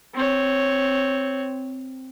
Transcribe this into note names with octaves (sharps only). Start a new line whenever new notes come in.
C4 C#5